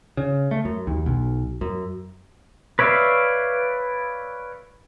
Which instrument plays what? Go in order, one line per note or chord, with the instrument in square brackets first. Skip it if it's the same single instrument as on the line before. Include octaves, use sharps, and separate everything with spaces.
[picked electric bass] C#3
A3
F#2
D#2
B1
F#2
[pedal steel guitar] B4 C#5 D5 E5 F5